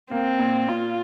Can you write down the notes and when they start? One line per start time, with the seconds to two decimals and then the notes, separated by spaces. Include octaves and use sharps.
0.11 A#3 C4
0.39 A#2
0.68 A#2 F4